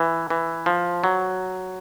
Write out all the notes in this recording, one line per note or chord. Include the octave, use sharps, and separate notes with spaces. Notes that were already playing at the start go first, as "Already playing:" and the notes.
Already playing: E3
E3
F3
F#3